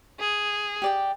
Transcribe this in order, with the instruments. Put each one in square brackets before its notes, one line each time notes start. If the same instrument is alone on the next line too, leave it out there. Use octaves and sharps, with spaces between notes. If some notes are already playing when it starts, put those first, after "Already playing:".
[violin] G#4
[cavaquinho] G4 D5 G5